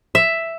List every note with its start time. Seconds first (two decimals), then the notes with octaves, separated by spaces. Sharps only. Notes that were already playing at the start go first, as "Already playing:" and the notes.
0.15 E5